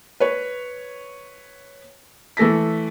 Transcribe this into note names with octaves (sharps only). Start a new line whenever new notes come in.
B4 C#5
E3 A3 A4 A#6 B6